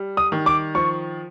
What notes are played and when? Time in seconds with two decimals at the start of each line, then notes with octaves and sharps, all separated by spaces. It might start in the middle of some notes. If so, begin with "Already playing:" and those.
Already playing: G3
0.17 D#6
0.32 D#3
0.46 D6
0.75 F3 C#6